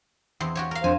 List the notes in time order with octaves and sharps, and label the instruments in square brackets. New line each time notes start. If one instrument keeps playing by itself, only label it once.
[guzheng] E2 C4
F#4 G4 C#5
A#4 F5
[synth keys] F2 F3 D4 [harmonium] C5 [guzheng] G#5